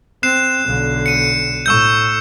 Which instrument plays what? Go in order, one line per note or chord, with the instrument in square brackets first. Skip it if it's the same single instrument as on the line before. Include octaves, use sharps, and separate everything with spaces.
[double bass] C4 [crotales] F#6 C7 E7
[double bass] B1 D3
[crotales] C#7 D#7
[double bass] A2 [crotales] C#6 E6 G6